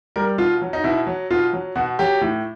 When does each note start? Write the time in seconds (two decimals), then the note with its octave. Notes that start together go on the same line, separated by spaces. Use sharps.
0.16 G3 A#4
0.38 B2 F4
0.62 F#3
0.73 D#4
0.84 B2 E4
1.07 F#3
1.31 B2 F4
1.53 F#3
1.76 B2 F#4
1.99 F#3 G4
2.21 A2